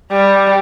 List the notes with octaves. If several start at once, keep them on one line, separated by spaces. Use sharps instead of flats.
G3